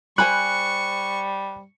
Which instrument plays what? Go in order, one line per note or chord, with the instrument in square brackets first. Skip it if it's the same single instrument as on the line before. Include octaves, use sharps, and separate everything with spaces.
[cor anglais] G3 [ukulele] C5 G#5 B5 [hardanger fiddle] C#6 [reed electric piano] F#6